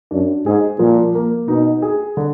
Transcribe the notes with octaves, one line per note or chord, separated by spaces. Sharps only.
F#2 D4
G#2 G#4
A#2 F3
A#3
B2 D#4
G#4
D3